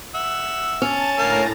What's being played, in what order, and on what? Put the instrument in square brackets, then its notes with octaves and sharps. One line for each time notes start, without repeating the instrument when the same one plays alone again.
[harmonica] E5 F#5
[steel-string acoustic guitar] C#4 [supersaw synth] A5 A6
[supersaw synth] A2 A#5 [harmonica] D3 A#3 F6